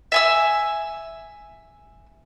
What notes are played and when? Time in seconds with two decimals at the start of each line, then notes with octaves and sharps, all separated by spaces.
0.12 E5 G#5 E6